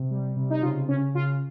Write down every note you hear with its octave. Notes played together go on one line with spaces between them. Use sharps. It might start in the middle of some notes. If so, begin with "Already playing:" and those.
Already playing: C3
G3
C3
D#4
C#3 F4
C#3 C#4
C#3 F4